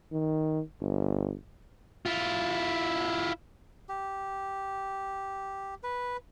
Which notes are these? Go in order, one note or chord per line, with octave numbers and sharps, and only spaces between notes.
D#3
G1
E4 F4
G4
B4